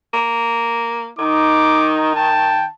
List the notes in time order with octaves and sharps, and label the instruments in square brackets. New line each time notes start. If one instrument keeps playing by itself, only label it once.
[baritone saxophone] A#3
[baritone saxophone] D#3 [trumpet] D#4 [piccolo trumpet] D6
[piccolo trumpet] G5 [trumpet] A5